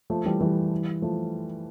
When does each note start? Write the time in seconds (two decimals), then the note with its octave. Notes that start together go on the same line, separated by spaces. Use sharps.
0.10 F3 A3
0.25 E3 G3
0.41 E3 G3
1.02 F3 A3